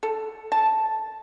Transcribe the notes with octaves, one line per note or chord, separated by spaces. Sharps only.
A4
A5